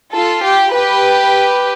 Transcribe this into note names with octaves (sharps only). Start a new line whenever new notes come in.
F4 A4
G4
G4 B4